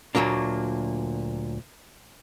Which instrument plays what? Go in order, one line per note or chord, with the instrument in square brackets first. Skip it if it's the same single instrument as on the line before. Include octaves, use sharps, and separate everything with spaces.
[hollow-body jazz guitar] D2 A#2 F#3 A#3 D4